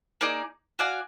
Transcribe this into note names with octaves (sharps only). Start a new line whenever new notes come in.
A#3 D#4 G#4 D5
F#4 D5 F5 G#5